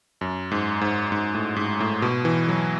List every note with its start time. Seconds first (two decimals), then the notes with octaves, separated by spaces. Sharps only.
0.21 F#2
0.51 G#2
0.81 G#2
1.12 G#2
1.35 A2
1.56 G#2
1.80 A2
2.02 B2
2.25 E3
2.49 F#3